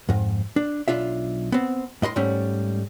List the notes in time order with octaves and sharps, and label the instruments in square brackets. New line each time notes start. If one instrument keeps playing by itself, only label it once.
[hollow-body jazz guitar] F2 G#2
D4
B1 D4 F4 E5
B3 C4
A2 D#5 B5 C6
G#2 G3 A3 C#4